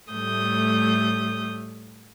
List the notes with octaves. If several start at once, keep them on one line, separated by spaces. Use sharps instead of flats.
A2 G3 A3 D#6 G6